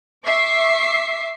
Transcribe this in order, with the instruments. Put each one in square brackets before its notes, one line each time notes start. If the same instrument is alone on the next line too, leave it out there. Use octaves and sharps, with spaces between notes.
[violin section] E5 C#6 D6 C7